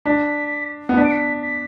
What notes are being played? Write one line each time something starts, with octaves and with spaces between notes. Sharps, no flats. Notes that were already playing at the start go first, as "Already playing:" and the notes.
D4 B6
B3
D4 B6
D7
B6
B6